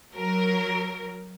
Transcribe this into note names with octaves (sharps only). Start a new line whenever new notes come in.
F#3 A#4